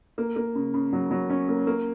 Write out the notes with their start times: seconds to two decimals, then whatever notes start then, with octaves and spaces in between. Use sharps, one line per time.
0.18 A#3
0.36 A#3
0.55 C#3
0.74 C#3
0.93 F#3
1.11 F#3
1.30 C#4
1.49 A#3
1.67 A#3